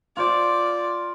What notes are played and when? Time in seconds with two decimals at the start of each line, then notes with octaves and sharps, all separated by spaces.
0.17 F4 C5 D5